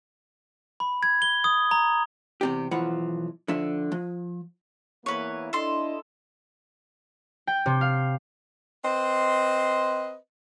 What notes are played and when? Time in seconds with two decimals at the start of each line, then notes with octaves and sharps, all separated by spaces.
0.80 B5
1.03 G#6
1.22 G7
1.44 D#6
1.71 A#5
2.41 E2 C3 G4
2.71 B1 E3 F3 F#5
3.48 D3 F3 E5
3.92 F3
5.06 E2 A#3 E4 B4 C#5
5.53 D4 E4 A4 D#5 C6
7.47 G5
7.66 C3
7.81 F5
8.84 C4 B4 C5 D#5